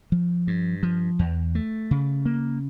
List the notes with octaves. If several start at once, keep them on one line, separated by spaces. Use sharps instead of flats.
F3
G2
F3
E2
A3
C#3
A#3